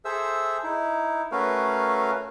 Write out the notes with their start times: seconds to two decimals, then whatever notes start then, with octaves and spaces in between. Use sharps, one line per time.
0.05 G#4 A4 C5 E5 E6
0.63 D#4 E4
1.32 A3 C#4 F#4 A#4 B4 F5